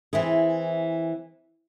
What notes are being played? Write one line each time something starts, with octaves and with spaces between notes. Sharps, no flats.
E3 C4 E4 G#4